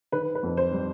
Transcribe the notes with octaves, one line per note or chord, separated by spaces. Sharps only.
D#3 B4
B4
F2
C5
G3